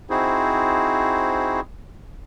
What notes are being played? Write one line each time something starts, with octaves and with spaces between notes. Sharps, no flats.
C4 D#4 E4 F#4 G#4 C5